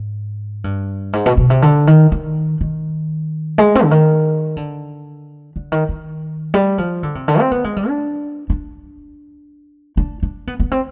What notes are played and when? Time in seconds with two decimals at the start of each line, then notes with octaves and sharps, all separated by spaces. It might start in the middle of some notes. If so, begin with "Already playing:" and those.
Already playing: G#2
0.64 G2
1.13 G#2
1.26 B2
1.37 B2
1.50 C3
1.62 D3
1.87 D#3
2.12 D#3
2.61 D#3
3.58 G#3
3.75 C4
3.84 D3
3.91 D#3
4.57 D3
5.56 D3
5.72 D#3
5.89 D#3
6.54 G3
6.78 F3
7.03 D3
7.15 C3
7.28 D3
7.40 C4
7.52 B3
7.64 G#3
7.76 G3
7.88 D4
8.50 D4
9.97 D4
10.23 D4
10.47 B3
10.60 B3
10.72 C4